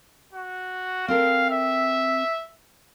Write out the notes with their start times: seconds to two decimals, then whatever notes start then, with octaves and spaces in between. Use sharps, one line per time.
0.33 F#4
1.08 C4 A4 A#4 F5
1.51 E5